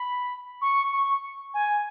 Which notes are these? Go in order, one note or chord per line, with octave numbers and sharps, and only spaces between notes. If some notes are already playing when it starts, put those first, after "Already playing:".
Already playing: B5
C#6
C#6
G#5